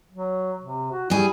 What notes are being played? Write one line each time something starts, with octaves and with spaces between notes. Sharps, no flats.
F#3
C3
F#4
G3 E4 G#4